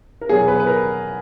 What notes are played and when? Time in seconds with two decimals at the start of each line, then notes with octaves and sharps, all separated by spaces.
0.21 A#4
0.29 E2 B2 F#3 G#4
0.48 B4
0.60 B4
0.67 A#4